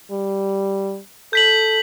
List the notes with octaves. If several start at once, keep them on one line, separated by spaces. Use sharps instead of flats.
G3
A4 G6 B6 F#7